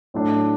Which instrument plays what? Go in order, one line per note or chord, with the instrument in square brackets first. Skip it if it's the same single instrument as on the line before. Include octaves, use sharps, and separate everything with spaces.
[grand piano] A2 F#3 A3 D4